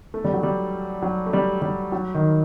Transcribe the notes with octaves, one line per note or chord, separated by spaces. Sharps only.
A3
G3
F#3
G3
F#3
A3
G3
G3
F#3
D#3